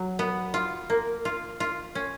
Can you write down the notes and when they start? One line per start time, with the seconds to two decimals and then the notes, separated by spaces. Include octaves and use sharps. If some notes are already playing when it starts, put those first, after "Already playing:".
Already playing: F#3
0.19 B3
0.54 F4
0.90 A#3
1.25 F4
1.60 F4
1.95 C#4